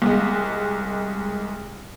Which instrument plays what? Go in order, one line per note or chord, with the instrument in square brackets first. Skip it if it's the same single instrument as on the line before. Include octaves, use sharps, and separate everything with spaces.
[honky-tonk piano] C2 G#3